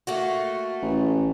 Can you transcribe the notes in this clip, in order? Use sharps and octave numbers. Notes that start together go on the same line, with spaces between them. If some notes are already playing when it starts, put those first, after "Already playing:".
A3 A#3 F#4
A1